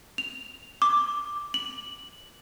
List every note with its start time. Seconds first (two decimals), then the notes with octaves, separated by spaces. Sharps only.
0.18 F7
0.82 D6
1.54 F#7